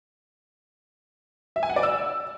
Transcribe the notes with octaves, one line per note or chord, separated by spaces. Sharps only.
E5
G#5
F#5
D5
E6